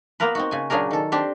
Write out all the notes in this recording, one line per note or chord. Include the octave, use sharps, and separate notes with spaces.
A#3 B3 F4 A#4 B4
C4 D#4 F#4
C#3 G#5
A#2 C#3 F#3 D4 G#4 A#4
D#3 A4
C4 D4 G4 C5